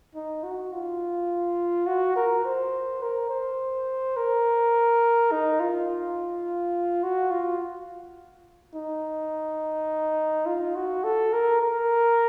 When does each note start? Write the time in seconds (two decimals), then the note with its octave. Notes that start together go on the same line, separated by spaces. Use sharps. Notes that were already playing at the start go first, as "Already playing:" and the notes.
0.15 D#4
0.43 F#4
0.73 F4
1.87 F#4
2.16 A#4
2.45 C5
3.02 A#4
3.30 C5
4.17 A#4
5.32 D#4
5.60 F4
7.04 F#4
7.31 F4
8.75 D#4
10.46 F4
10.76 F#4
11.04 A4
11.33 A#4
11.62 A#4